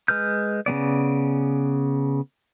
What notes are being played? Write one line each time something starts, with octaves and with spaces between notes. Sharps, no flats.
G#3 B4 F6 G6
C#3 G3 B3 D5